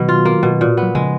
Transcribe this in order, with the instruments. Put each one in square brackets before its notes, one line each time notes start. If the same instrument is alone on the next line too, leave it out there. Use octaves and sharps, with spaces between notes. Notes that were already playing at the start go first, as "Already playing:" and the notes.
Already playing: [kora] B2 [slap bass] D#3 F#3
[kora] F4
A#3
B2
A#2
B3
[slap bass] F#3
[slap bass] C#3 F3 [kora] G#3